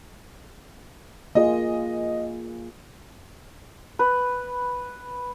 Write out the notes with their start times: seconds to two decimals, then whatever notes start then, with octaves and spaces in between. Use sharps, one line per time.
1.35 A#3 F4 G#4 D#5
3.99 B4